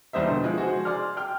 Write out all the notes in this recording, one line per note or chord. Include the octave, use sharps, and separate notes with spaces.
E2 G3 C5 D#5 E5
B2 D3
F3 G#3
F#4 G#4 C5
G#4 D5 C6 F6
G5 F6